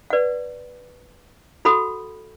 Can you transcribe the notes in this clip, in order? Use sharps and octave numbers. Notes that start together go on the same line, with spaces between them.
B4 D5 F#5
F#4 A4 F#5 B5